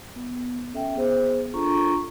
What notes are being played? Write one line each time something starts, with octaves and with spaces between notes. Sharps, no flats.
B3
C#4 A4 E5 G5
B3 G#4 C5
D4 F4 A4 A#5 C#6